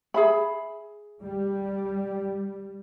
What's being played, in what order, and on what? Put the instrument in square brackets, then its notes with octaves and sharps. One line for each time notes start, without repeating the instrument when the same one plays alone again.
[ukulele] G#4 E5 B5
[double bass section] G3